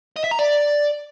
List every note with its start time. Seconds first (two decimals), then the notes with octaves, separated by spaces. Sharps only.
0.16 D#5
0.24 E5
0.31 A#5
0.39 D5